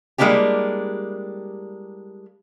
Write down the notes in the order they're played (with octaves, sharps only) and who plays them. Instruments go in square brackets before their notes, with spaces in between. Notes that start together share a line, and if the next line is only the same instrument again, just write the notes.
[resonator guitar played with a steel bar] G3 G#3 A#3 D4 E4 G4